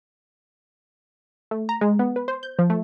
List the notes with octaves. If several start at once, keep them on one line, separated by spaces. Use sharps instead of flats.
A3
A#5
G#3
B3
B4
C5
G6
F3
A3